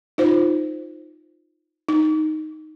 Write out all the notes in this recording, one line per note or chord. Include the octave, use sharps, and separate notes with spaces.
D#4 F4 C5
D#4